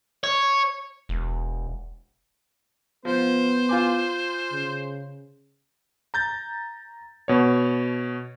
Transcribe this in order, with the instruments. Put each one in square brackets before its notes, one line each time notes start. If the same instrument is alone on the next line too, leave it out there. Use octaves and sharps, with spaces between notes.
[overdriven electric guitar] C#5
[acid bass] E1
[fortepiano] F3 [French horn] B3 [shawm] C5
[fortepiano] F4 G#5 D6
[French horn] C#3
[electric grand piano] A#5 G6 A6
B2 C#5